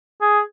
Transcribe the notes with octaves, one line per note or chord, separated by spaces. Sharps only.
G#4